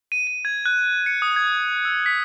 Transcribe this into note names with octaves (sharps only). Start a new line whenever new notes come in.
D#7
D#7
G#6
F#6
C#7
D#6
G#6
E6
B6